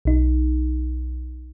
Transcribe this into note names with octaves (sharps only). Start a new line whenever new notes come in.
B1 D#4